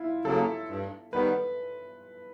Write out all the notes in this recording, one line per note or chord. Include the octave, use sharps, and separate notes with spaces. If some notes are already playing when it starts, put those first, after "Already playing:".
Already playing: E4 F4
C#3 F#3 A#3 A4
G2
D#3 G3 B3 B4